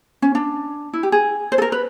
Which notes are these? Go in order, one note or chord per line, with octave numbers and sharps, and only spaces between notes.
C#4
D4
E4
G4
G#4
C5
A4
A#4
B4